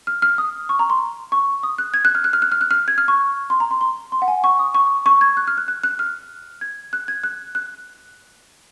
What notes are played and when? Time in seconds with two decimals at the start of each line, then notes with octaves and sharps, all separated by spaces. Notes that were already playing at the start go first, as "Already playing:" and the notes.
0.07 F6
0.22 F6
0.38 D#6
0.69 C#6
0.79 A#5
0.90 C6
1.32 C#6
1.63 D#6
1.78 F#6
1.94 G#6
2.05 F#6
2.15 F6
2.24 F#6
2.33 F6
2.42 F#6
2.52 F6
2.61 F#6
2.71 F6
2.88 G#6
2.98 F6
3.08 C#6
3.50 C6
3.60 A#5
3.71 C6
3.81 C6
4.12 C6
4.22 F#5
4.28 G#5
4.44 C#6
4.59 D#6
4.75 C#6
5.06 C#6
5.21 G#6
5.37 F#6
5.47 F6
5.57 F#6
5.68 F#6
5.83 F#6
5.99 F6
6.61 G#6
6.93 F#6
7.08 G#6
7.24 F#6
7.55 F#6